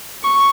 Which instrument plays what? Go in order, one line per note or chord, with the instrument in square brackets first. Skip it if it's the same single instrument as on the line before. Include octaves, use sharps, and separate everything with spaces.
[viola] C#6